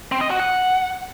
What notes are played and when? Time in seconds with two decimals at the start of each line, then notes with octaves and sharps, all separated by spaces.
0.12 C4
0.21 D#5
0.30 F#4
0.40 F#5